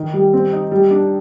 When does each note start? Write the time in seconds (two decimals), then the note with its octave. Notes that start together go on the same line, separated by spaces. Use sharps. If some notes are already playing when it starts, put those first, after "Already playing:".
Already playing: D#3
0.13 G3
0.33 C4
0.52 D#4
0.71 G3
0.91 D4